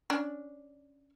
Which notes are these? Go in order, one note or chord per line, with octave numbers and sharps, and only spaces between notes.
C#4 D4